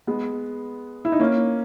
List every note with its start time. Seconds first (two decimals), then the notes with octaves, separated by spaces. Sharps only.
0.07 G#3 B3
1.05 E4
1.12 D#4
1.20 A#3 C#4